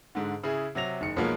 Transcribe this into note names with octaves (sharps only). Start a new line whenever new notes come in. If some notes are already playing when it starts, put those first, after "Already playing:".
G#2 D3
C#3 E4 G#4
C3 F#3 A#6 F7
F#1 D#3 C#7
B1 F3 F#3 G#3 A#3 B3